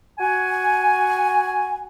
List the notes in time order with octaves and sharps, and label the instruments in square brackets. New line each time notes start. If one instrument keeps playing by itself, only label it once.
[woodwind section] F#4 G#5